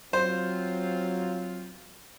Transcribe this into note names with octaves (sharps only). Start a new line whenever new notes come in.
F#3 C4 F4 C5